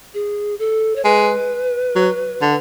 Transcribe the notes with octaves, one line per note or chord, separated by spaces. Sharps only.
G#4
A4
C#5
G#3 B4
F#3
D3